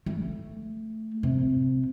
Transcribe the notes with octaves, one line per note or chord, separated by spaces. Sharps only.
A3
C3